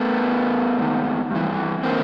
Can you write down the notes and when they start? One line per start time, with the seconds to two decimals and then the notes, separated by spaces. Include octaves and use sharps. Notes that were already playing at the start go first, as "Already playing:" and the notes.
Already playing: A3 B3
0.24 A2 E3
0.78 G#2 D#3
1.31 G2 E3
1.83 D3 A#3 C4